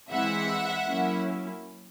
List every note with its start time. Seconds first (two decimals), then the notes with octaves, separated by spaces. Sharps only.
0.11 E3 G#3 C4 E4 E5 F#5
0.87 F#3 A#3 C#4 E4